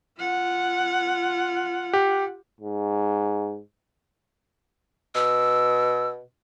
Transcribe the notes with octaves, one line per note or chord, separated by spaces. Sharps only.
F4 F#5
G4
G#2
B2 E6